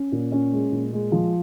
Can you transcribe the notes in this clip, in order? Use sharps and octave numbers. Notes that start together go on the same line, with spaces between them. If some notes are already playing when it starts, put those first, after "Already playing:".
Already playing: C#4
A#2
C#4
G#3
A#2
G#3
F3